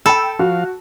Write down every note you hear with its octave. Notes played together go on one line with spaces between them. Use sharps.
A4 G5 B5 E6
F3 F#4 F5